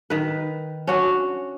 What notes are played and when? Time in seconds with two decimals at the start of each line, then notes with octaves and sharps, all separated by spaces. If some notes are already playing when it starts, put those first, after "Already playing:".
0.10 D#3 B4
0.87 C#4 D4 F#4